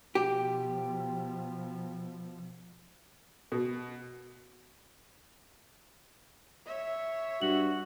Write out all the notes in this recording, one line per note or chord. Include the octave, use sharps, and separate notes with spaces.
B2 F3 G4
B2
C#5 E5
G2 F#4 F#7